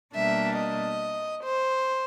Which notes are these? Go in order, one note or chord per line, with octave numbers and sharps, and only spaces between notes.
B2 G3 A#3 D4 E5
D#5
C5